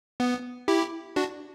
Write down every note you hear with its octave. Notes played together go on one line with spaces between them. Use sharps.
B3
E4 G4
D4 F#4